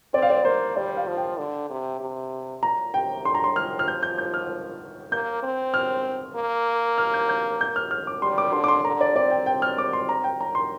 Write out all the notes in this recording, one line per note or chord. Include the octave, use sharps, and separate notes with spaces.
C4 D5
F5
D5
A#3 C5
G3 D5
F5
F3
G5
D3
C3
C3
A#2 A#5
C3 G5
D3 C6
A#5
C6
F3 F6
F6
G6
G6
G6
F6
A#3 G6
C4
F6
A#3
F6
G6
G6
G6
F6
F6
D6
G3 C6
D6
D3 C6
D6
C6
D3 A#5
D5
C4 D5
G5
G5
F6
D6
C6
A#5
G5
A#5
C6